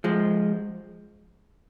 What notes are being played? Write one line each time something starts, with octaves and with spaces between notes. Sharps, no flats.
F3 G#3